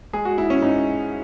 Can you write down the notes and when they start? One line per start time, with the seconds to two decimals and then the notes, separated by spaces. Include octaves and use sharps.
0.13 G#3 G#4
0.25 F#4
0.37 G#2 E4
0.50 C#4
0.62 G#2 D#4